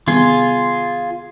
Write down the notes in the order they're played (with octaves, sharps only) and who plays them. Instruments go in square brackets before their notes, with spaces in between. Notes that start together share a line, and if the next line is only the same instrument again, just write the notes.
[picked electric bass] C3 D#3 G3 B3 [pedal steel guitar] F4 G#4